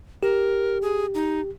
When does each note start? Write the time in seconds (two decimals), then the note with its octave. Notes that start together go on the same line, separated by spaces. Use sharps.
0.23 G4 A#4
0.82 G#4
1.14 D#4